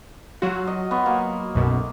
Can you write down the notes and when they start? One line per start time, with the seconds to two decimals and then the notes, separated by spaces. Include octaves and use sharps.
0.42 F#3 F4 F#4
0.67 D#5
0.91 B3 C#6
1.06 A#3
1.55 B1 F#2 B2